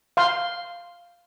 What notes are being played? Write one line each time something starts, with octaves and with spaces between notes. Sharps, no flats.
F5 C6